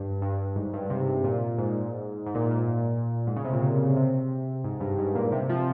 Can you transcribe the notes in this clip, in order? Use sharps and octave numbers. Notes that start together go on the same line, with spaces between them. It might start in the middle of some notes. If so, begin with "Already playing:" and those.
Already playing: G2
G2
G#2
G2
C3
A#2
G#2
G#2
A#2
A#2
G#2
C#3
C3
A#2
C#3
C3
G#2
G2
G#2
A#2
C3
F3